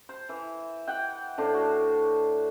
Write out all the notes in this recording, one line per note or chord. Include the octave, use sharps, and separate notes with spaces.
C5
E3
F#5 G5
A2 D4 C5 C6
F#4